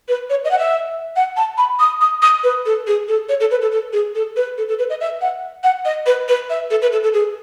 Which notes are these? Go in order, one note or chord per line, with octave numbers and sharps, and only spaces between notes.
B4
C#5
D#5
F#5
E5
F#5
A5
B5
D#6
D#6
D#6
B4
A4
G#4
A4
C#5
A4
B4
A4
A4
G#4
A4
B4
A4
A4
B4
D#5
E5
F#5
F#5
D#5
B4
B4
E5
A4
B4
A4
A4
G#4